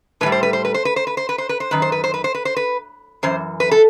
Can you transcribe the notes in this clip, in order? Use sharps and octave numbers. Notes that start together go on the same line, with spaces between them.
A2 E3 B4
G3
C5
B4
C5
B4
C5
B4
C5
B4
C5
B4
C5
B4
C5
F#2 D#3 B4
C5
B4
C5
B4
C5
B4
C5
B4
F#2 E3 C5
B4
A4